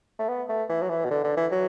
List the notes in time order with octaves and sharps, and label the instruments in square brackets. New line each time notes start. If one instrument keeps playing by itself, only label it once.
[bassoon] A3
B3
A3
E3
F#3
E3
B2
D3
D3
E3
F#3